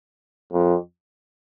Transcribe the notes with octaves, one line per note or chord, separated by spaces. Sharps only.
F2